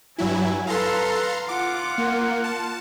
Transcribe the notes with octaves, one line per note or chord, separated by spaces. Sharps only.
G2 F#3 E4 G#5
A4 B4 F5 A#5 C6
F4 F#5 D6
A#3
A5